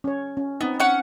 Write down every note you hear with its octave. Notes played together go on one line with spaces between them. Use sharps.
C#4 C#5
C#4
B3 C4 D#4
C#4 F#5